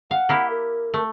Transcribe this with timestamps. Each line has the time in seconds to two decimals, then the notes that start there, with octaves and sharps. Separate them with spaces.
0.11 F5 F#5
0.29 A#3 E4 G4
0.50 A#4
0.94 A3